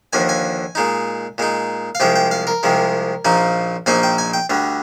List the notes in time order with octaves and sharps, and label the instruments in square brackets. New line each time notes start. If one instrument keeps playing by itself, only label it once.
[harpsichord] D#2 D3 F3 G#5
G#5
A#2 G#3 D#4
A#2 G#3 D#4
F5
C2 C3 F3 G#3 G5
G5
F5
A#4
C2 C3 F3 G#3
A#1 A#2 F3 A#3 D#4
A#1 A#2 F3 A#3 D#4 G#5
G5
G#5
G5
D2 D3 G3